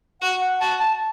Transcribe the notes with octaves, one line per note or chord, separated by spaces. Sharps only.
F#4 F#5
F#5
F#4 A5
A5